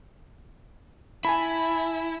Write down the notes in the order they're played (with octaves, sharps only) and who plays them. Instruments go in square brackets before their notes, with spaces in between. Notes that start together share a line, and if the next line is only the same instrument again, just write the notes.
[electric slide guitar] E4 [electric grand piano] G#5 A5 B5